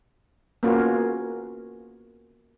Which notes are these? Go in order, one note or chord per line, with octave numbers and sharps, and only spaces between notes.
A#3 B3 C#4 F4 F#4